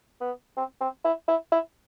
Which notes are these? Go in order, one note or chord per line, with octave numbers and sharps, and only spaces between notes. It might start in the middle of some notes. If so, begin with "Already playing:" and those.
B3
C4
C4
E4
E4
E4